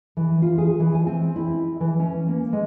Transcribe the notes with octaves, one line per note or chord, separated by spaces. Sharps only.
E3
F4
G#4
E3
G#5
C4
E4
E3
C#4
A#3
G#3